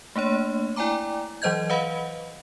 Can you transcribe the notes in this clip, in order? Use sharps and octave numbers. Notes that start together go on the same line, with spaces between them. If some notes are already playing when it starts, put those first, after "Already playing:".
A3 A#3 D4 C#5
E4 D5 G5 G#5 A#5 D6
E3 F#3 C5 D#5 G6 G#6
B4 D#5 F5 F#5 B5